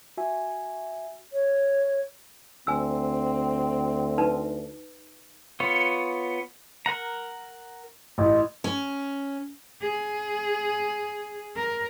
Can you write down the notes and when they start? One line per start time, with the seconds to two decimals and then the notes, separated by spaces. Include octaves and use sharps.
0.17 F#4 E5 G#5
1.32 C#5
2.67 D2 C4 G#5 E6
4.18 D#4 B4 A5
5.60 B3 F4 C#5
6.86 A#4 F#5 A#5
8.18 A1
8.64 C#4
9.81 G#4
11.56 A#4